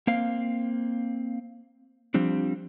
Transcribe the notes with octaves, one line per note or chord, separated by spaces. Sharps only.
A#3 C4 F5
F3 G3 C4 D4